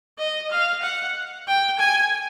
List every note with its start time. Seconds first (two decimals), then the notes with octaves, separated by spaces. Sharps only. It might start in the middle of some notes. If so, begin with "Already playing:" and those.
0.18 D#5
0.51 F5
0.82 F#5
1.47 G5
1.79 G#5